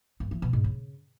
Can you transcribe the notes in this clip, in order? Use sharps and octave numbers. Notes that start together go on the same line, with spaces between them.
G2
E3
B2
G#2
C#3